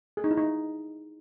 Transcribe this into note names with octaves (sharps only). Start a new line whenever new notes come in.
G#4
D#4
E4
D#4